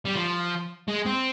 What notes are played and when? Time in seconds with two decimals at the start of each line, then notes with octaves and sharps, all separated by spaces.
0.05 G3
0.15 F3
0.88 G#3
1.06 C4